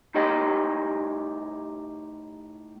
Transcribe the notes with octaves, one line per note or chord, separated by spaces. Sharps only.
A2 D#4 G4 C#5 D#5 G5